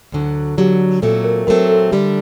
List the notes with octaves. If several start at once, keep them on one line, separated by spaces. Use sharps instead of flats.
D2 D3 F#3
D2 D3 F#3 G4
A#2 F#3 A3 C4 A4
A#4
A#2 F#3 A3 C4 A#4
A4
D3 G3 D4 G4